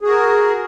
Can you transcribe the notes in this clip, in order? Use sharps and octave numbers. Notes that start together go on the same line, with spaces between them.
F#4 G#4 A#4